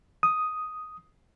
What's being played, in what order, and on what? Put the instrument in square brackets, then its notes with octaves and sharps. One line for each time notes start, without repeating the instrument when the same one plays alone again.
[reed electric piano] D#6